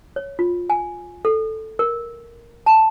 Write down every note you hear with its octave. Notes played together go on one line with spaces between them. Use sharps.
C#5
F4
G#5
A4
A#4
A5